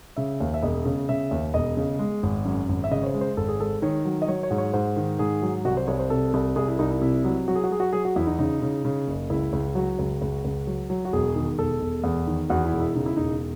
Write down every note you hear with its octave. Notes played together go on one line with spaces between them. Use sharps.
C#3 E5
D#2
E5
E1 D#5
C#3
C#3 E5
D#2
E1 D#5
C#3
G#3
G#1
F#2
G#1
E5
C#3 D#5
C#5
C5
G#3
C5
G#1 A4
G#4
G#3 A4
D#3 C#5
F#3
D#5
F#3 C#5
C#5
G#2
C#5
G#2 C5
D#3
G#2 G#4
F#3
C2 F#4
C5
C2 C#5
C5
C3 A4
C2
C2 G#4
E4
C2 D#4
E4
C3 E4
F#3
F#3 F#4
G#4
F#4
F#3 G#4
F#4
F#3 G#4
F#4
E2 E4
D#4
C#3 D#4
C#3
C#3
F#1
C#2 E4
C#2
F#3 F#4
C#2
C#2
C#2
F#3
F#3
F#4
E1 G#4
D#3
E1 A4
E1
E2
D#3
E2 F#4
E4
E1
E4
C#3 D#4
E4
E1 D#4